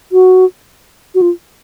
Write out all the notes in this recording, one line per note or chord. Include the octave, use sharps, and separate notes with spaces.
F#4
F#4
F4